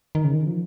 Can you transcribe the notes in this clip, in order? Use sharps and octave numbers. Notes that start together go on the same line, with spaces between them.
D#3
C#3
D#3
F3